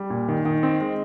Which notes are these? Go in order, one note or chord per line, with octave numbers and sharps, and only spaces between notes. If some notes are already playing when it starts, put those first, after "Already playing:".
Already playing: G3
A#2
D#3
D#3
C4
G#3